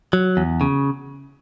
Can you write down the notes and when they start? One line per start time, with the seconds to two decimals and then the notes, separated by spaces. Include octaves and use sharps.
0.13 F#3
0.37 E2
0.61 C#3